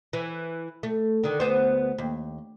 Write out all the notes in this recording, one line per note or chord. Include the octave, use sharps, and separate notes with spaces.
E3
A3
D3 D#3
D2 B3 C5
D#2